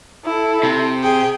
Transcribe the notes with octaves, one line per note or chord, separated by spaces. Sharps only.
E4 A4
C3
G#4 G5